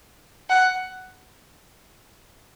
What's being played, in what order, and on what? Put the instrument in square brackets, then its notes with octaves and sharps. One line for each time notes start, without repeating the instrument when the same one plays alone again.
[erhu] F#5